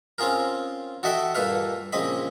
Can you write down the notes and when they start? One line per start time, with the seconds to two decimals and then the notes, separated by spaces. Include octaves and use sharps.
0.18 C4 C#4 F4 G#4 A#4
1.03 F#4 A4 D#5 E5 F#5 G5
1.35 G2 A#2 A4 B4 F5
1.93 A#1 C#3 C4 D#5 B5